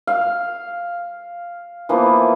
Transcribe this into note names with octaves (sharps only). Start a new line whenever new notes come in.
F5
E3 F3 A#3 B3